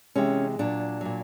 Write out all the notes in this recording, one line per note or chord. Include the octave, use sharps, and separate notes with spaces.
C3 E3 G#3 C#4
A#2 F#3 D4
A#2 F#3